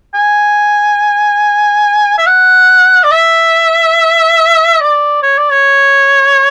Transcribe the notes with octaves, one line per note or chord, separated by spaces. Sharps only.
G#5
E5
F#5
D5
E5
D5
C#5
D5
C#5